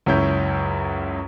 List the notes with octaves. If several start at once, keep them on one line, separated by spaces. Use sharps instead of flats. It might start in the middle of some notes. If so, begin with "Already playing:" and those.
C#2 F#2 C#4 E4 G6